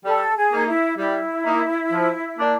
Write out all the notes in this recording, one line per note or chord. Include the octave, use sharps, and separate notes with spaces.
G3 A4
G#4
A#3 D#4
E4
G3 E4
A#3 D#4
F3
A#3 D4